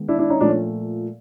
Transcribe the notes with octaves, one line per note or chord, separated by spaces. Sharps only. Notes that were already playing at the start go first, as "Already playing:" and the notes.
Already playing: D#3 G#3 B3
D4 E4
D4 E4
C#4 D#4
A#2 F3 A3 D4
C#4